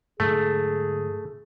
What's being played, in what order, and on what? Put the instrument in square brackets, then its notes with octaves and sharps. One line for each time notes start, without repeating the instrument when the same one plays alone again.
[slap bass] G#2 D3 F#3 [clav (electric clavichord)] A3 [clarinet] G#4